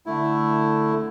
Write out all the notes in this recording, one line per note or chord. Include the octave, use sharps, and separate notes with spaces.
D3 A3 E4